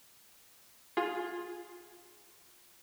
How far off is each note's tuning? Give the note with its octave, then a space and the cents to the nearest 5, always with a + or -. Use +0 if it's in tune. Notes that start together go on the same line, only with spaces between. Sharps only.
F4 +15 G#4 +0